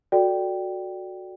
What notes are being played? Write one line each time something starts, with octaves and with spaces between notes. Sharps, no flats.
F#4 A4 D5 G5